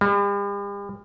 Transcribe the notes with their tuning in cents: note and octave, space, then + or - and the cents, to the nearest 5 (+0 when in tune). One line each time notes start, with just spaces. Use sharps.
G3 +45